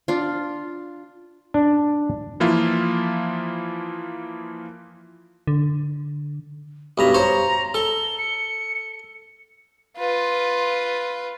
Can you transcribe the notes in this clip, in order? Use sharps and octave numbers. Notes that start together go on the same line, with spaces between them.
D4 F4
D4
E3 F3 A#3 E4 F4
D3
B1 G2 A#5 B5
C5 C#5 A#5
A4 G7
C#7
F4 B4